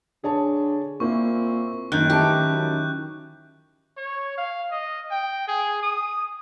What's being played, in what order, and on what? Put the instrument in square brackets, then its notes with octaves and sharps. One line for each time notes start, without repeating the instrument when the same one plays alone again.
[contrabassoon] D3 [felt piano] G#4 C#5 A5
[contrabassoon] A#2 [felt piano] A#3 C4 E4 [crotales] C#6
[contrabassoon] F#1 [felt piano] F#2 [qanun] D#3 [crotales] F#6 G6
[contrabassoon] A1 [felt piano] D#4 E4 A5 [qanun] G4
[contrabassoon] F#2
[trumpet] C#5
F5
D#5
G5
G#4
D#6